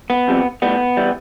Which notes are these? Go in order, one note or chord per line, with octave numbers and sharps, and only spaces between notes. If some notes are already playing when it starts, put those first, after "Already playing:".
B3
F2 C3 G3
A2 G3 B3
E3 G3